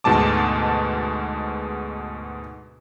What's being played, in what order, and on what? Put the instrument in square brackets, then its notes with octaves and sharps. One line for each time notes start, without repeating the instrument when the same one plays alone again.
[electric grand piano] D2 G#2 B2 G#3 A5 D6